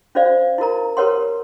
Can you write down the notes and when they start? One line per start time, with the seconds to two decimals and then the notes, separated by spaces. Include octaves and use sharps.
0.15 C#4 F#4 C5 D5 F5
0.58 E4 F#4 A#4 A#5
0.97 G4 A#4 B4 C#5 F#5 C6